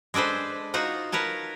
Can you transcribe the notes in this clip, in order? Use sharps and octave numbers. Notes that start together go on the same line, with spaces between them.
G#3 D4 A4 B4 C5
D#4 F4 F#4 F#5
A#4 B4 C#5 A5